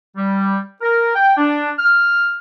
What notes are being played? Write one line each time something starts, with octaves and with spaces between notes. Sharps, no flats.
G3
A#4
G5
D4
F6